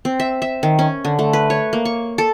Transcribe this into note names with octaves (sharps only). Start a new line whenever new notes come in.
C4
E5
E5
D#3
C#4
D3
A3
B4
C#5
A#3
C#6
A4